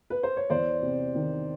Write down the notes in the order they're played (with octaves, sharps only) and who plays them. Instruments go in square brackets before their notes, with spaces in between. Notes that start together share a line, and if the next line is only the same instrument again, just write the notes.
[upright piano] B4
C5
C#5
E2 C5 D5
C3
D#3